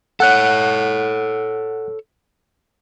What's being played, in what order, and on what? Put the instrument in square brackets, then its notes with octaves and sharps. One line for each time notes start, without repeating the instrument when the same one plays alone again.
[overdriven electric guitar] A4 C#5 [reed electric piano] F#5 F#6